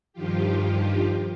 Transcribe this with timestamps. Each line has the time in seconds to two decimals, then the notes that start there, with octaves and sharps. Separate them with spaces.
0.13 G2 D#3 F3 F4 G4